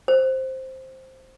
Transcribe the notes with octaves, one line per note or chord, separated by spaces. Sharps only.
C5